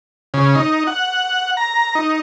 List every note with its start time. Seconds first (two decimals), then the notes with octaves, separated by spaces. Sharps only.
0.34 C#3
0.56 D#4
0.87 F#5
1.57 A#5
1.95 D#4